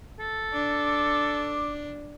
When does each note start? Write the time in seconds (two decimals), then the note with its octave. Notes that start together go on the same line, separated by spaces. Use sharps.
0.19 A4
0.53 D4 D6